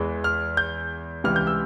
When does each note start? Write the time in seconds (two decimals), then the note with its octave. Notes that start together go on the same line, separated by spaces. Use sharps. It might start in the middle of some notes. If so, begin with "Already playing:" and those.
Already playing: E2 E3 G#3
0.24 F6
0.57 G6
1.24 C#2 C3 E3 G3 F6
1.36 G6
1.47 E6